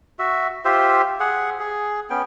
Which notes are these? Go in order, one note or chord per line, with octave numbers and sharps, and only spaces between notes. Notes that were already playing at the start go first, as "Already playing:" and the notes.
F#4 E5
F4 G4 C5 E5
G#4 F#5
G#4
B3 C#4 G5